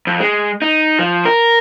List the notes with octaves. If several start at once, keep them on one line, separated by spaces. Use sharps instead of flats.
F2
G#3
D#4
F3
A#4